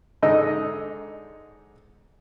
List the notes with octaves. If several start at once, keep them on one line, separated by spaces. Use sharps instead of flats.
G#2 D3 D#4 D#5 D#6 E6